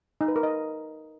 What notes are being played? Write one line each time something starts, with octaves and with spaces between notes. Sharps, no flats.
D#4
B4
A#4
D#5